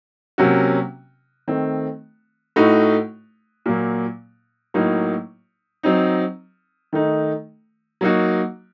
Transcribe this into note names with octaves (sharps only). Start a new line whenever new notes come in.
C3 F#3 A#3 C#4 F#4
D#3 A3 C4
A2 A3 D#4 F#4
A#2 F#3 A#3
A2 F#3 A#3 D#4
F#3 C4 D#4
D#3 A3 D#4
F#3 A#3 D#4 F#4